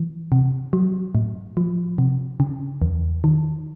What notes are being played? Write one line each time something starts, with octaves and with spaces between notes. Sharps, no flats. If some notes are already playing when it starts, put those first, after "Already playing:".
Already playing: E3
C3
F#3
A2
F3
C3
C#3
E2
D#3